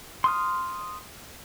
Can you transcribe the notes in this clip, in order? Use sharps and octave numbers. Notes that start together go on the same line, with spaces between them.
C6 D#6 F6